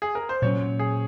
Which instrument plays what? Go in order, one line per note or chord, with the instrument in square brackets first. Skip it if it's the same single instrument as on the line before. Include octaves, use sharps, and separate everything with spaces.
[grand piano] G#4
A#4
C5
[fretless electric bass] A#2 F#3 C#4 [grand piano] C#5
[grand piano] G#4